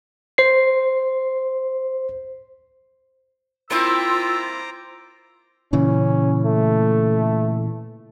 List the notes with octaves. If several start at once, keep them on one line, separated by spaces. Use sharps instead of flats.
C5 C7
A#3 C4 E4 F4 C5 A#5 D6 E6
A#2 C#3 E3 C#4
A3